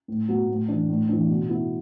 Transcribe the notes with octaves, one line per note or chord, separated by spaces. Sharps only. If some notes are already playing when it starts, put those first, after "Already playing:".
A2
F#3 B3
A2
E3 D4
A2
E3 D4
B2
B3 E4